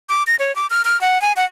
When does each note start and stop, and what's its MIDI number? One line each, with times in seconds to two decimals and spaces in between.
0.09 0.23 86
0.27 0.36 94
0.39 0.55 73
0.56 0.67 86
0.70 0.82 89
0.85 1.00 89
1.01 1.21 78
1.22 1.32 80
1.37 1.45 78